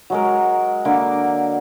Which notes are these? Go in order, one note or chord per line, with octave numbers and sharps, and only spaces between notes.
F#3 G#3 A#4
D3 A#3 D6